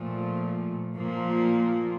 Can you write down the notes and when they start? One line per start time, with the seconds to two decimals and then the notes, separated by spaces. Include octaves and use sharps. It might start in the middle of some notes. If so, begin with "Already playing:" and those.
Already playing: A#2 F3 A3
0.94 A#2 F3 A#3